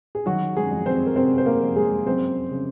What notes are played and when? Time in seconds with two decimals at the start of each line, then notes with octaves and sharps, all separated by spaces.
0.15 G#4
0.26 D#3 F#3 F#4
0.56 G#3 G#4
0.71 F2
0.86 C4 C5
1.06 A#4
1.16 C3 C4 C5
1.38 C5
1.46 A#3 A#4
1.61 F2
1.76 G#3 G#4
2.06 F#2 C4 C5
2.51 C#3